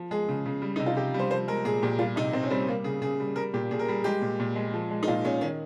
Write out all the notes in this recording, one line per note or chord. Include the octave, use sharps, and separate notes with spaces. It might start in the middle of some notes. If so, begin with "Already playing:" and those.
Already playing: F3
G#3 G#4
C#3
C#3
G3
C3 D#4
F4
C3 G4
G3
C5
F3 C5
G#3 A#4
A#2 G#4
A#2 G4
G3 F4
C3 D#4
C3 C4
C#4
G3 C4
G3 A#3
C#3 G#4
C#3 G#4
G3
G3 A#4
A#2 G4
A#2 G#4
A#4
G3 G#4
G#3 G4
A#2
A#2
G#3
F3
G#3
D#4
A#2 F4
A#2 C#4
D#3 C#4